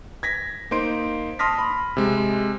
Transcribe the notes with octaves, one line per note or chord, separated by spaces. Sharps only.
G#6 A#6 B6
A#3 D#4 C5 C6 D7
A5 C6 D#6 F6 A#6 B6
B5
C3 G#3